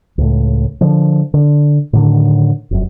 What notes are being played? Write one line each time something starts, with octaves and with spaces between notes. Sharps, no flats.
C#2 A2
D3 F3
D3
A2 D3 D#3
F1 F#2